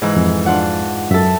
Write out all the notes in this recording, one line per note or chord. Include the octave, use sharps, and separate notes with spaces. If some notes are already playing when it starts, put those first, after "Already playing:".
G#2 E3
F2
D4 F4 F#5
F#2 A4 E5